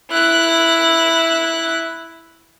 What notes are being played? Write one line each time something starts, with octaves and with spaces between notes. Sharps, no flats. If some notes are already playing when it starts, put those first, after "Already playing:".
E4 F#6